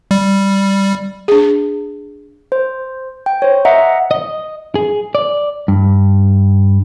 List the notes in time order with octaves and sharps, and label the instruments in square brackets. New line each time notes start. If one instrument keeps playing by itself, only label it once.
[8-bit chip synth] G3
[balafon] D4 G#4
[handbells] C5
G5
C5 C#5
D#5 E5 F#5 A#5
[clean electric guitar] D#5
G#4
D5
G2